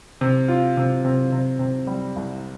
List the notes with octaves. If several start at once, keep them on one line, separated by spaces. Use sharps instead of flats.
C3
F4
C3
C3
C3
C3
G3
C2